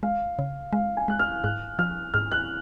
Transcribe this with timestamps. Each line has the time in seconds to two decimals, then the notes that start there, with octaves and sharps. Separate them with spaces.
0.03 G#3 F5
0.39 C#3
0.73 G#3 F5
0.97 G#5
1.08 G#3 F#6
1.19 F6
1.44 G#2 F#6
1.79 F3 F6
2.14 G#2 F6
2.31 F#6